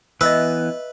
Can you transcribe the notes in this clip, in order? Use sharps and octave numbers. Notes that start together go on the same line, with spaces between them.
E3 B3 B4 D#5 E5 E6